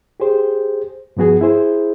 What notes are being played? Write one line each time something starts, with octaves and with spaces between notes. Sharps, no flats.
G4 G#4 C5
G2 F3 B3 F#4 G#4
E4 G#4 C5